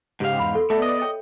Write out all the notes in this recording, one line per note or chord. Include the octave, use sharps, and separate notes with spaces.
G#2 C#3 G4 C5 F5
E2 B5 C6
A4
A3 B3 A4 D5 E5
D#5
C#5 G5